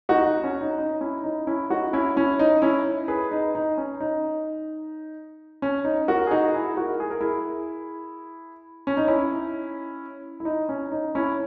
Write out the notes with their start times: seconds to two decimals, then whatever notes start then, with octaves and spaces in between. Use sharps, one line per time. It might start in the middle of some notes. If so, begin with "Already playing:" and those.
0.09 D#4 F#4
0.26 D#4
0.39 D#4
0.44 C#4
0.61 D#4
0.78 D#4
1.01 C#4 E4
1.24 D#4
1.47 C#4 E4
1.70 D#4 F#4
1.93 C#4 E4
2.16 C#4 E4
2.39 D#4
2.62 C#4 E4
3.08 G#4 B4
3.31 D#4
3.55 D#4
3.78 C#4
4.00 D#4
5.62 C#4
5.85 D#4
6.08 F#4 A#4
6.27 G#4
6.31 D#4 F#4
6.54 E4 G#4
6.77 F#4 A#4
7.00 G#4
7.10 A#4
7.21 E4 G#4
8.87 C#4
8.97 D#4
9.08 C#4 E4
10.40 E4
10.45 D#4
10.69 C#4
10.92 D#4
11.15 C#4 E4